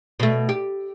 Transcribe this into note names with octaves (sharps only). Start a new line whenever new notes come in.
B2 A3
G4